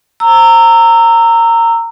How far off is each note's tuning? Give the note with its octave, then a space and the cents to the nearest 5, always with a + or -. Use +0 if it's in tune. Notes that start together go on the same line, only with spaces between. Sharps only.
A#5 -20 E6 +0